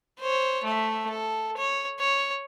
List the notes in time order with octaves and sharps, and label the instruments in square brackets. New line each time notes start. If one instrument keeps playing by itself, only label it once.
[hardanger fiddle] C5 C#5
A3 E5
A4
C#5
C#5